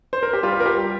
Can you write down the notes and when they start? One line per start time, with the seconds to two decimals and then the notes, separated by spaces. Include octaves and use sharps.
0.13 C5
0.23 A#4
0.33 G4
0.43 G3 F4
0.60 A#4
0.66 G4